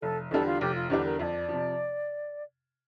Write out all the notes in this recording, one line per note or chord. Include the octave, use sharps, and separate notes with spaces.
F1 A4
E2 D3 G3 D4 A4
F4
F1 G4
F4
E2 D3 G3 D4 G4
A#4
F2 D5 E5
C3 F3